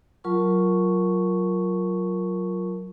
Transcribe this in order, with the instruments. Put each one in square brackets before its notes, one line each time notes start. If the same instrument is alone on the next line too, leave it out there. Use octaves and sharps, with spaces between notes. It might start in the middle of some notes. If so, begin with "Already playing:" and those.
[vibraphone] F#3 F4 A#4 A5 C#6